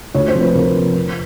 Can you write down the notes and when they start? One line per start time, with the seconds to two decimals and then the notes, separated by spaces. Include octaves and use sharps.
0.15 D2 C#5
0.28 C5
0.35 C3 F3
0.41 B4
0.55 D2 A#4
0.76 C3 F3
0.96 F2